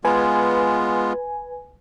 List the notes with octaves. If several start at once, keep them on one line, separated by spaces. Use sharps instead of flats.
G#3 B3 F4 B4 G#5